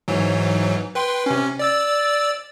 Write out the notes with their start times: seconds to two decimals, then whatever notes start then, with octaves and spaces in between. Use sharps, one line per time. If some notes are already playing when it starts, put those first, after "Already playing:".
0.08 G#2 E3 F#3
0.95 B4 G5 C6
1.26 C3 C#4
1.59 D5 E6 A6